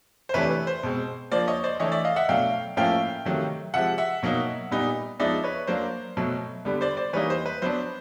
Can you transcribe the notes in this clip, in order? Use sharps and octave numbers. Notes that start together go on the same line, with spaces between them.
C5
C3 E3 A3 D4 B4 C#5
B4
C5
B2 G#3 C4
F3 A#3 D4 C5 D5
C#5 D#5
C5 D5
E3 A3 D4 C#5 D#5
D5 E5
D#5 F5
E5 F#5
B2 F#3 A3 D4 F5 G5
A2 F3 A#3 C#4 E4 F5 G5
C3 D#3 F#3 A3
C3 F3 G#3 E5 F#5
E5 F#5
B2 F#3 A#3 D#4
A#2 G3 B3 D#4
F3 G#3 B3 D#4 D5 E5
B4 C#5
F#3 A#3 D4 C5
B2 F#3 A3
D3 G3 B3
C5 D5
C5 D5
E3 G3 A#3 D#4 B4 C#5
C5
B4
F#3 B3 D4 C5